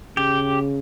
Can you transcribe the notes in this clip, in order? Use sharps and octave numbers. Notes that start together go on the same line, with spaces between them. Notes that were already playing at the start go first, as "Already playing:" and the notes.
C#3 G4